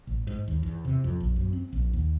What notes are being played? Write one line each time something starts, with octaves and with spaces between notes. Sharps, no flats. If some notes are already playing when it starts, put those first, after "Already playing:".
A1
G#2
D#2
E2
C3
F2
A#1
F#2
C4
A#1
D#2